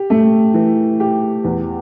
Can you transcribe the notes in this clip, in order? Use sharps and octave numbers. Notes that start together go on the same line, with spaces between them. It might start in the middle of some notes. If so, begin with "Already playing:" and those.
Already playing: G4
A3
E3
G4
E2